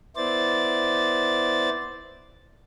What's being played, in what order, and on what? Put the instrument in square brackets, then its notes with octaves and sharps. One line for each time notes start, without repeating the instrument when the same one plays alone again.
[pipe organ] B3 E4 C5 D5 A6